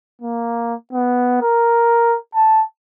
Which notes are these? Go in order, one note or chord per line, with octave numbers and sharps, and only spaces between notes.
A#3
B3
A#4
A5